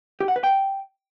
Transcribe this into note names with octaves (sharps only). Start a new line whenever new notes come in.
G4
F#5
B4
G5